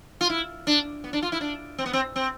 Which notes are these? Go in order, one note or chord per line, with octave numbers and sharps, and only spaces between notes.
F4
E4
D4
B3
D4
F4
E4
D4
C4
B3
C4
C4